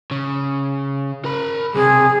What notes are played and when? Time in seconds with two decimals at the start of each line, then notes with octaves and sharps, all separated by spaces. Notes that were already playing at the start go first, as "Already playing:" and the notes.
0.11 C#3
1.25 A#4 B5
1.75 B1 C3 G#4